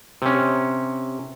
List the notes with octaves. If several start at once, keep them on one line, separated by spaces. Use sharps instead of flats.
C3 C#4